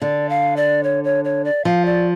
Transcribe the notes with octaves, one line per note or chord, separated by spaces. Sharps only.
D3 D5
F5
D5
C#5
C#5
C#5
D5
F3 F5
D5